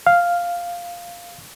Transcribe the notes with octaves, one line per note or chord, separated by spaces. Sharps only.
F5